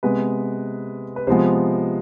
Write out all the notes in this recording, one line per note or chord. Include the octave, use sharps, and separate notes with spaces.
C3 G#3 B3 B4
B4
C3 F3 G#3 B3 C5